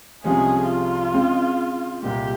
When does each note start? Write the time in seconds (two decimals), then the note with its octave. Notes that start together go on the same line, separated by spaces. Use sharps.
0.24 C2 C3 F3 G#3 C#4 G#4
0.69 F4
1.14 C#3 G#3 C4
2.03 C2 A#2 G#3 G4